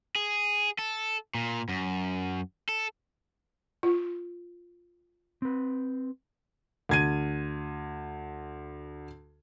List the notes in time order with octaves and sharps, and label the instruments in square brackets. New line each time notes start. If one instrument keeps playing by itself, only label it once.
[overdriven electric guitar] G#4
A4
A#2
F#2
A4
[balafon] F4
[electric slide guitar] C4 B4
[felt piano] D2 G#6 D#7